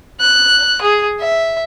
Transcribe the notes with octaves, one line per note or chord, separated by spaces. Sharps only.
F#6
G#4
E5